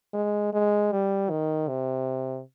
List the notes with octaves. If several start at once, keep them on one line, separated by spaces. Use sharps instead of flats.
G#3
G#3
G3
D#3
C3